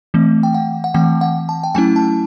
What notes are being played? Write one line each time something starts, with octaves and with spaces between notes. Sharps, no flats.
E3 A3 C4
G5
F#5
F#5
E3 A3 C4 G5
F#5
A5
G5
F#3 A3 C#4 E4 G#5
A5